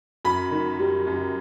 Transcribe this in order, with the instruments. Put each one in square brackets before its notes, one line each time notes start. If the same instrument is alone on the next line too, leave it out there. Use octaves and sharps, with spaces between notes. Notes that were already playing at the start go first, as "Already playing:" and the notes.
[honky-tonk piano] F#2 B5
D#3
G3
F#2